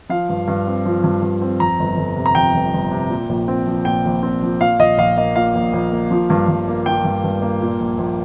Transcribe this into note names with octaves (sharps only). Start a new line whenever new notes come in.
F3 F5
G2
G2
C4
F3
G2
G2
C4
F2 A#5
G1
G1
C3
A#5
F2 G5
G1
G1
C3
A#2
A#1
C4
F3
A#2 G5
A#1
C4
F3
A#2 F5
A#1 D#5
A#1 F5
A#3 D#5
A#2 F5
A#1
A#1
A#3
F3
G2
G2
A#3
F3 G5
G2
G2
A#3
A#2
A#1
A#1